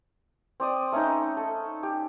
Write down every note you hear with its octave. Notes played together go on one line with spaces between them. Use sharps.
C4 D5 D#6
A3 C#4 D#4
A4
G4